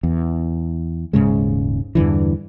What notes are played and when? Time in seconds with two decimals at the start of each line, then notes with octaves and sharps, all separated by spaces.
0.03 E2
1.13 D#1 G#2 C#3 G#3
1.95 E2 G2 D3 E3